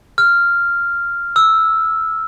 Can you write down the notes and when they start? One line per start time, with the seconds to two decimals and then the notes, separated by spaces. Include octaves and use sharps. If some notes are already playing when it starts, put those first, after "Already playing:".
0.18 F6
1.36 E6